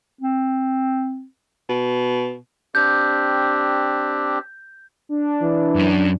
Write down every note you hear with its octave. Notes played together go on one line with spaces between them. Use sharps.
C4
B2
C4 D4 G4 G6
D4
E3
F#2 C#4